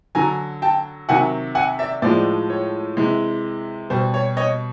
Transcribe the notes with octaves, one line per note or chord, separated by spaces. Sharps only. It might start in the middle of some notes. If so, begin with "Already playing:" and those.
D3 F#3 G#5 A#5
G5 A5
C3 D#3 F#3 F#5 G#5
F#5 G#5
D5 E5
A2 F3 G#3 C5 D5
C#5
C3 E3 G#3
B2 G3 C5
C#5
C#5 D#5